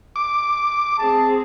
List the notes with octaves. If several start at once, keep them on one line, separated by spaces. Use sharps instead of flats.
D6
C4 G#4 A5